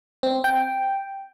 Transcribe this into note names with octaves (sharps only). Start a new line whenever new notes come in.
C4
G5